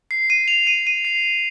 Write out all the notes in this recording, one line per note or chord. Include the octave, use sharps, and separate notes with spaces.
C7
D#7
F7
D#7
D#7
C7